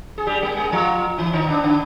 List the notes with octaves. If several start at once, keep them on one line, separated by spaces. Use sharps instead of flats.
G#4
G3 G4
G#3 G#4
G#3 G#4
F3 F4
E3 E4
D#3 D#4
D3 D4
D3 D4